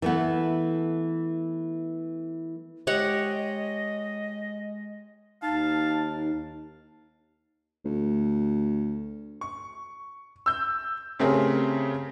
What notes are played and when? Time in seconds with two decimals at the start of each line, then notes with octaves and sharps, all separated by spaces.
0.02 E3 A3 B3
2.87 G#3 G4 C#5 D#5 F#5
5.42 D#2 D#4 F5 A5
7.85 D2
9.41 C#6
10.46 E6 G6
11.19 C#3 A3 C4 G4 G#4 A#4